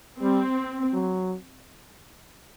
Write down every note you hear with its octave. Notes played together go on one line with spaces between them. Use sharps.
G3 C4
F#3